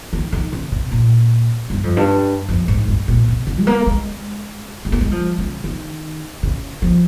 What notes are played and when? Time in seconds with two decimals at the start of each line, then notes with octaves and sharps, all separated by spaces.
0.13 D#3
0.33 D#3
0.53 C#3
0.72 C3
0.92 A#2
1.70 G2
1.84 F2
1.97 G2
2.49 F2
2.68 G#2
2.88 G2
3.08 A#2
3.28 C3
3.47 C#3
3.60 G#3
3.67 A#3
3.86 G#3
4.85 G#3
4.92 A#3
5.01 G#3
5.11 F3
5.38 C#3
5.64 D#3
6.43 C#3
6.82 F3